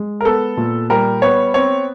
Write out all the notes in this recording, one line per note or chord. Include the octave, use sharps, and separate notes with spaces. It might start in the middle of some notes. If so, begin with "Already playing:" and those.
Already playing: G#3
A#4
B3 A4
A#2
G3 A#4
B3 C#5
C4 C#5